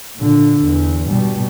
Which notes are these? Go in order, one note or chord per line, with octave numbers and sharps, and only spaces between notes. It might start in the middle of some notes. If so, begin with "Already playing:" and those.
A#2 D3
E2
B2 G3